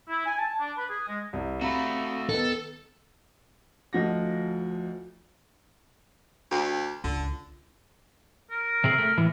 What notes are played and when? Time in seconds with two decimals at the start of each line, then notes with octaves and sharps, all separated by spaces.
0.08 E4
0.26 G#5
0.38 A5
0.60 D4
0.77 B4
0.90 G#4
1.08 G#3
1.33 C2
1.61 A3 C4 F#4 F5 A#5 B5
2.29 C#2 D#3 B3 A4
3.93 D2 F3 D#4 F#5 A#6
6.51 D2
7.04 C#2 D3
8.51 A#4
8.84 C3 C4 G#4
8.98 A3
9.18 A2 E3